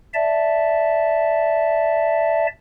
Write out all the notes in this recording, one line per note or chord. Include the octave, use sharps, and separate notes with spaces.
D5 E5 A5